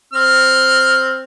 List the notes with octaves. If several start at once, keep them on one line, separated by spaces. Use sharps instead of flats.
C4 F6